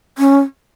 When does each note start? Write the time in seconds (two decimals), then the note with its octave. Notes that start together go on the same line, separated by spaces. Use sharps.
0.18 C#4